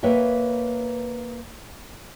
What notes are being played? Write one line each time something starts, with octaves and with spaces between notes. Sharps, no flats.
A#3 B4 C#5 E5 G5